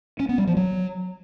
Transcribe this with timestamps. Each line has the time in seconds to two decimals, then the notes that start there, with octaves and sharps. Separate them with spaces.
0.19 C#4
0.29 B3
0.38 G3
0.47 F3
0.57 F#3